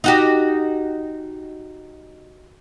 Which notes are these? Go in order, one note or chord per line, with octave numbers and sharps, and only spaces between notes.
D#4 F#4 G4